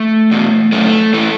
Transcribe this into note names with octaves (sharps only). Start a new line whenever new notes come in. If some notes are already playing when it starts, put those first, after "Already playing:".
Already playing: A3
E2 B2
F#2 C#3 E3 A3
A2 E3 A3